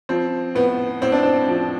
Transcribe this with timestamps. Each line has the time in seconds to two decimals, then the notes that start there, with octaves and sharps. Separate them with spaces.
0.09 F3 C4
0.55 A2 B3
1.02 A2 C4
1.12 D4
1.23 C4
1.48 F3